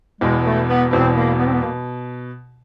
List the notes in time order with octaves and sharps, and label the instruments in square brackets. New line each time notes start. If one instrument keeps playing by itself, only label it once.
[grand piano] E1 E2 B2 [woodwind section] G#3
[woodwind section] A3
B3
[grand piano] E1 E2 B2 [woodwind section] C4
[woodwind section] A#3
B3
C4
B3
[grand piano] B2 [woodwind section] A#3